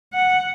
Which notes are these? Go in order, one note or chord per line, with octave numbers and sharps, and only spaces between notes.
F#5